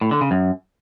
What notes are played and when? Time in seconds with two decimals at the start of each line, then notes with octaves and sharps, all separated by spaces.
0.01 A2
0.11 D3
0.21 C#3
0.31 F#2